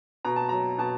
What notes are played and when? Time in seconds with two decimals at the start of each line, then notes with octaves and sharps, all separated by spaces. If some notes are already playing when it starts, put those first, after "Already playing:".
0.25 B2 A#5
0.36 A5
0.49 F#3 A#5
0.78 B2 A5